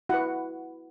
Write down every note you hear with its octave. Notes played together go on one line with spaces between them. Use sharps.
E4 F#4 B4 F#5